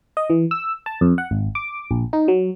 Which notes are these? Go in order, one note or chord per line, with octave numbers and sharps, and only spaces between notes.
D#5
E3
E6
A5
F2
F#5
G#1
D6
A#1
D#4
F#3